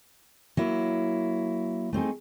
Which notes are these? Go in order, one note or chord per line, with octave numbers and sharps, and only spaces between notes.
F#3 A#3 E4
A3 C4 D#4 G#4